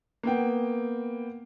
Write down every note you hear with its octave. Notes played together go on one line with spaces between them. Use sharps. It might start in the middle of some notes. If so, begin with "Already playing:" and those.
A#3 B3 G5